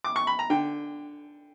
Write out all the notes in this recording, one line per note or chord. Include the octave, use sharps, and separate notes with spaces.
D6
C#6
B5
A#5
D3 G5